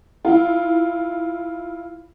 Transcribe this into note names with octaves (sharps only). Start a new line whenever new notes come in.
E4 F4